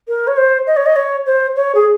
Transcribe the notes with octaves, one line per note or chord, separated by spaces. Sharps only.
A#4
C#5
C5
D#5
C#5
D#5
C#5
C5
C#5
G#4